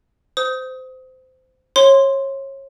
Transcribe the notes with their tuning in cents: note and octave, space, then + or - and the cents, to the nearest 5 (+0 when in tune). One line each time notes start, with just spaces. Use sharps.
C5 -20 D#6 +25
C#5 -30 C6 +0